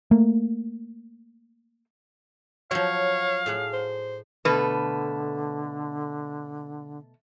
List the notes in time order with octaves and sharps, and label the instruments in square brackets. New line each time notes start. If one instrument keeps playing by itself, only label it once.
[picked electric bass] A3 A#3
[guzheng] F3 F#3 [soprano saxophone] C#5 [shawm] F5
[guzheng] A2 G#4 F#5
[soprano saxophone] C5
[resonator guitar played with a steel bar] B2 A3 B4 [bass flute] D3